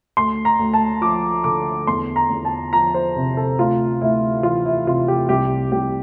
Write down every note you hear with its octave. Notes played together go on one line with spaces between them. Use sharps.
D2 C6
A#5
D2
A5
F3 D6
D3 D6
E2 C6
A#5
E2
A5
F3 A#5
C5
C3
A4
D2 F4
D2 E4
E3 F4
E4
C3 F4
G4
C2 G4
C2 G4